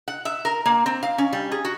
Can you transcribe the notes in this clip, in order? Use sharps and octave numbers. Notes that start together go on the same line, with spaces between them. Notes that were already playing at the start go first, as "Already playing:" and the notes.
F#5
E5
A#4
A#3
C4
F5
C#4
G3
G#4
F#4